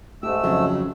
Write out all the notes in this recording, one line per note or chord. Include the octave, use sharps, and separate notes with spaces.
G#2 A3 G4 E6
F2 C#3 F#3